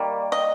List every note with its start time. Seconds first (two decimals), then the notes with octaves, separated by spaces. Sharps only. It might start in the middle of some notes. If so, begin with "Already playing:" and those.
Already playing: D#3 G3 A#3
0.32 D#5